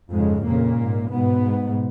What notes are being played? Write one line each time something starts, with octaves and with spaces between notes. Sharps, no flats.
F2 G#2 C#3 G#3
F2 A#2 C#3 A#3
G#2
G#2 B2 B3
G#2